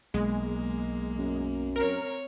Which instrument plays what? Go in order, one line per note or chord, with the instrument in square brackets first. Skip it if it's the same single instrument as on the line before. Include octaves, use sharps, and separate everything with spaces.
[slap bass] B1 [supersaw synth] G#3 [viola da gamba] A#3
[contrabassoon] F#2
[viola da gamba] C4 C#5 [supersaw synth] A#4